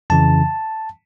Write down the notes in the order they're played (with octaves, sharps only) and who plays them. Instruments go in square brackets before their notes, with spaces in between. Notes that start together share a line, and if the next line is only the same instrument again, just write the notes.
[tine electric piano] F2 C#3 E3 A5